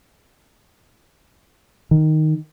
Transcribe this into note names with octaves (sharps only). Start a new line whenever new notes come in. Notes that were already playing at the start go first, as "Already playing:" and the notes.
D#3